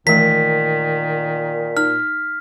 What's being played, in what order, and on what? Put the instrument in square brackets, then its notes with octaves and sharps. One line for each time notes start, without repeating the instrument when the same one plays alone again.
[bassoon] A#2 [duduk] D#3 [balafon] E3 A3 [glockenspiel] B6
[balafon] D#4 [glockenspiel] F6